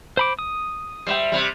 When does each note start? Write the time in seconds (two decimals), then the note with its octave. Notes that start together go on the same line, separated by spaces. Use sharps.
0.17 C5 B5 D6
0.39 D#6
1.07 G3 C5 E5 G5
1.32 C3 G3